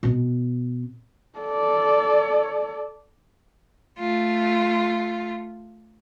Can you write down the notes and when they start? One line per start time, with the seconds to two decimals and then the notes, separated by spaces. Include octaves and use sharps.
0.03 B2 B3
1.39 A4 D5
3.99 A3 F4